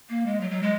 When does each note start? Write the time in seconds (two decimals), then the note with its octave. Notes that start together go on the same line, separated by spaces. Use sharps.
0.09 A#3
0.26 G#3
0.41 F#3
0.51 F#3
0.63 G#3